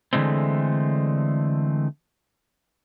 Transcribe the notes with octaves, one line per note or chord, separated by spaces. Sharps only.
D3 E3 G#3 A3 C4